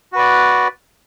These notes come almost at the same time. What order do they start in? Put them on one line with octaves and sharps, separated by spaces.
F#4 B4 D5